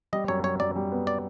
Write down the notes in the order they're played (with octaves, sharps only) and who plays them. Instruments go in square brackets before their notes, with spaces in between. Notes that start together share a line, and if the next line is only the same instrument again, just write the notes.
[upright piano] G3 [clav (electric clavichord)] D#5
[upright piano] F#2 [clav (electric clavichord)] C#5
[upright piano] F#2 [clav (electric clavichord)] C#5
[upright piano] F#2 [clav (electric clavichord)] D5
[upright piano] G3
B3
[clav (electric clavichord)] D5